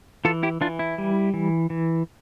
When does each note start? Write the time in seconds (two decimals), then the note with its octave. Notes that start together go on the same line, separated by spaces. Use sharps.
0.25 E3 F4 A4
0.43 E4 G4
0.61 E3 D4 F4
0.79 E4
0.98 G3
1.34 E3
1.70 E3